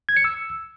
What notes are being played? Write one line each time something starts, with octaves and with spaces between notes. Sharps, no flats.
G#6
C#7
E6